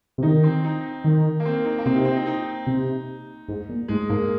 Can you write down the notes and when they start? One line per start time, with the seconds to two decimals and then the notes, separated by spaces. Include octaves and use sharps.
0.18 C3
0.23 D#3 D#4
0.44 C4
0.64 D#4
1.04 D#3
1.40 A#3
1.45 C4
1.65 D#4
1.78 A#3
1.86 C3 C4
1.96 D#4
2.05 C4
2.16 D#4
2.26 D#4
2.67 C3
3.48 G#2
3.69 A#2
3.88 G#2 G#3
4.09 G#2 A#3